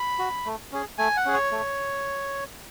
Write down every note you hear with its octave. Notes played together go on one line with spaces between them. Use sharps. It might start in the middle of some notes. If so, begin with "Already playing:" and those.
Already playing: B5
F#4
A3
C#4 G#4
A3 G#5
F#5
C#4 G#4
C#5
A3